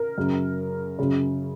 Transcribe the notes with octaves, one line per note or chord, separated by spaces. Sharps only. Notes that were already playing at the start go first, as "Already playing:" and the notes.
Already playing: A#4
F#2 C#3
F#2 C#3